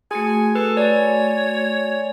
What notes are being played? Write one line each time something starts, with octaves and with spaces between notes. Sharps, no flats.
A3 F#4 G#4 G#5 C6
A4 B4
C#5 D5 G#5